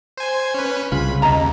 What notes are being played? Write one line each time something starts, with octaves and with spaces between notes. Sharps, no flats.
C5 G#5
C#4 B4
C2 C#3 F4 B5
D#2 D#5 A5 A#5